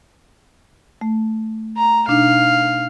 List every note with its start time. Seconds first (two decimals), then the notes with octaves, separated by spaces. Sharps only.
1.01 A3
1.77 A#5
2.08 B2 D4 D#4 F5